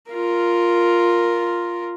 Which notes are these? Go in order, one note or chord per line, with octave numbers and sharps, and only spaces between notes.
F4 A#4